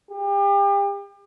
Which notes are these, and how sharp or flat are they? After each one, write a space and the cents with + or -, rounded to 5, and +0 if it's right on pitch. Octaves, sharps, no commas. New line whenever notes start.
G4 +35